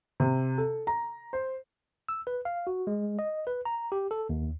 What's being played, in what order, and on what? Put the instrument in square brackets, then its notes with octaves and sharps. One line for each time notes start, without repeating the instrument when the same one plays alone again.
[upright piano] C3
A4
A#5
C5
[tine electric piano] E6
B4
F5
F#4
G#3
D#5
B4
A#5
G4
A4
D#2